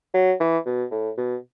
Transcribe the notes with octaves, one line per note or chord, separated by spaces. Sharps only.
F#3
E3
B2
A2
B2